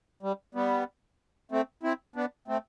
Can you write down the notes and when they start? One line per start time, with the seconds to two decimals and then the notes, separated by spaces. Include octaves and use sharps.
0.23 G3
0.55 G3 B3
1.52 A3 C4
1.83 C4 E4
2.16 B3 D4
2.48 A3 C4